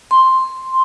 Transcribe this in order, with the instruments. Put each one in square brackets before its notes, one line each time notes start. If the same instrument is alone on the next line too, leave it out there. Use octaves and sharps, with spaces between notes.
[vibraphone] C6